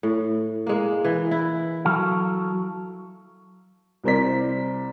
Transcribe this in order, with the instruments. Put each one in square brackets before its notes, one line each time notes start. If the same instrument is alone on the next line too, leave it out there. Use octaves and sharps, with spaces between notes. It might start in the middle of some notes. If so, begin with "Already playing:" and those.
[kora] A2
G#3 A#3
E3
E4
[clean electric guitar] F#3 A4 F5
[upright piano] C2 E4 A#4 C5 D5 B6